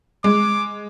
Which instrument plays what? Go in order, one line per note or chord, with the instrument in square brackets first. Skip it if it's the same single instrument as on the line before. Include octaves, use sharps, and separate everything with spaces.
[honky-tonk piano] G#3 [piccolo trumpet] D6